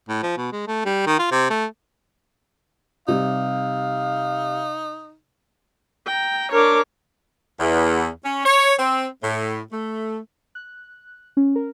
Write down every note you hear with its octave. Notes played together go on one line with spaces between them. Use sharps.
A2
F3
B2
G#3
A3
G3
D#3
F4
C3
A3
C3 G3 D#4 F5
G5 A#5
D4 A#4 C#5 D6
E2
C#4
C#5
C4
A2
A3
F#6
C#4
A#4